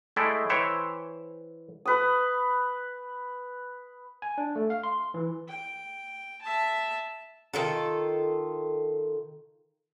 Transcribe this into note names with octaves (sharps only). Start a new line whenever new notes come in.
G#3 A3 E4 D5 G5
E3 C5 C#5 E5 G5
B4 D#6
G#5
D4
A3
F5
C6
E3
G5
E5 A5
D#3 F4 A4